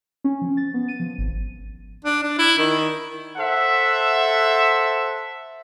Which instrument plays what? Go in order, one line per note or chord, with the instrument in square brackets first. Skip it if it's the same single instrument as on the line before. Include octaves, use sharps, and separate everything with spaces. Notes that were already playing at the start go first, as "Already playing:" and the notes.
[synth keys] C#4
F3
A6
B3
D#7
F3
G#1
[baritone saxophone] D4
D4
E4
D#3
[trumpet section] A4 C5 E5 F#5 A5